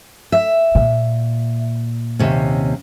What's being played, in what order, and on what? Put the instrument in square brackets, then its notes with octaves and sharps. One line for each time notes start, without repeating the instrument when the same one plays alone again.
[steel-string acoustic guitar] E5
[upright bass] A#2
[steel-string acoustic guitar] D#2 C3 C#4